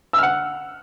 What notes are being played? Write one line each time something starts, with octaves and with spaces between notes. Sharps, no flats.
F#5 E6 F6